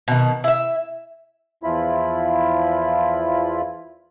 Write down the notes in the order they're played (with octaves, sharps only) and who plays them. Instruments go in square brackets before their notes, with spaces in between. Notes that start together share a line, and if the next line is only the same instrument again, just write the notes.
[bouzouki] B2 D#3
E4 E5
[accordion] E2 F3 E4 F4 B5